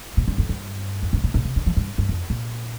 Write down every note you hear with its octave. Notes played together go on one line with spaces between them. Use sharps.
A#2
G2
F2
G2
F2
G2
A#2
A#2
C3
D3
F3
G2
G2
F2
A#2